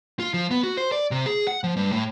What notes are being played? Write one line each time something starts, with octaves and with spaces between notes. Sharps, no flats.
F4
F3
B3
F#4
C5
D5
C3
G#4
F#5
F3
G2
A2